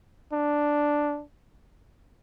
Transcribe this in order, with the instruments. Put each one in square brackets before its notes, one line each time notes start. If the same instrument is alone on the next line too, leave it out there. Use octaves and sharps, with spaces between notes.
[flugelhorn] D4